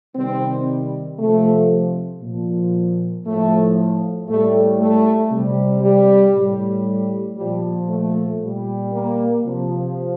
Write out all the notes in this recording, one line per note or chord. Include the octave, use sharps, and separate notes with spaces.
C3 D#3 G3 C4
C3 F3 A3
A#2 F3
A2 F3 A3
A2 G3 A3
A3
C3 G3
G3
A2 G3
A#2 F3 G3
A3
A#2 G3
A#3
C3 F3